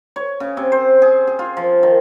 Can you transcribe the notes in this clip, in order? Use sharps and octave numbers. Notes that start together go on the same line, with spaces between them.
C#5
C#3
C3
C5
G#4
G#4
F4
F3
D#3